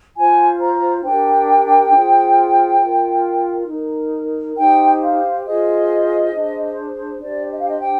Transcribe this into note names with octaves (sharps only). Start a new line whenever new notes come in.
F4 C5 G#5
A#5
D4 G4 A#4 G5
F4 G#4 C5
F4 A#4
D#4 A#4
D#4 G4 C5 G5
F5
F4 G#4 C5 D#5
D4 G#4 C5
D4 G4 C5 D5
D#5
F5
D#5
G5